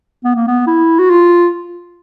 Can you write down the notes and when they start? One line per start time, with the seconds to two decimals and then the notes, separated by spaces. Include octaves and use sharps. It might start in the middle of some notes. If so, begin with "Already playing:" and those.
0.24 B3
0.35 A#3
0.47 B3
0.67 E4
0.99 F#4
1.10 F4